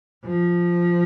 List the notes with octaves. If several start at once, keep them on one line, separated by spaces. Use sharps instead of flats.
F3